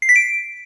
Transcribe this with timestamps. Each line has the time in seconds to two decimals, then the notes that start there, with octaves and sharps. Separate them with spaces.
0.02 C7
0.09 B6
0.16 D7